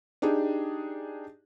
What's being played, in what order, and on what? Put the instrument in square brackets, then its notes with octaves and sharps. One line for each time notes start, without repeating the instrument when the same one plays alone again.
[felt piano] D4 D#4 G4 G#4